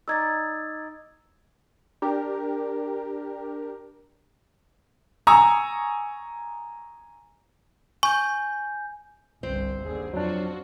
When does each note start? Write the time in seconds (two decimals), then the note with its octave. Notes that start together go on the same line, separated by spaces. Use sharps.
0.08 D#4 D5 E6 G#6 A6
2.02 D4 G4 A#4
5.27 G#5 A#5 C#6 D#6 E6
8.03 G#5 C#6 G6
9.43 G1 C2 G2 C4 C5
9.83 D#2 D3 G#4
10.13 F2 F#3 D4 F4 F#4